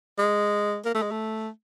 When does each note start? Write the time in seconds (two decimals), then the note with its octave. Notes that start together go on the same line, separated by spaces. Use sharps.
0.18 G#3
0.85 A#3
0.95 A3
1.02 G#3
1.11 A3